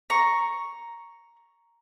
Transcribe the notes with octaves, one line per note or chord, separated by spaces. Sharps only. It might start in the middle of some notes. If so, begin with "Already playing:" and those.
A#5 C#6